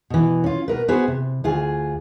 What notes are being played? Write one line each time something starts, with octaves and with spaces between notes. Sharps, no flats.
B2 E3
C#4 F4
B2 A#4 B4
B3 F#4 G#4 C5
C3
D2 F4 G#4